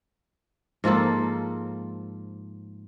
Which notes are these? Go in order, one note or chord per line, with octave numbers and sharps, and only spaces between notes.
G#2 F3 A#3 A4